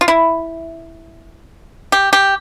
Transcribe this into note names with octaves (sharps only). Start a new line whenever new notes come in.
F4
E4
G4
G4